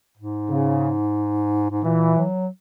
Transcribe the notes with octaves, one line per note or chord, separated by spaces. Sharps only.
G#2
C#3
G#2
A#2 E3
F#3